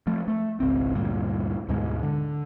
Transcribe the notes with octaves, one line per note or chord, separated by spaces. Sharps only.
F3 A3
A3
G#1 C#2 C4
D2 G2 A#2
D2 G#2 B2 G#3
D3